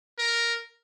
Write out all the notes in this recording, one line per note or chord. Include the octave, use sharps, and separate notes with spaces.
A#4